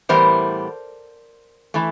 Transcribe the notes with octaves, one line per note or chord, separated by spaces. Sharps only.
A2 E3 G3 B3 A#4 C5
E3 A3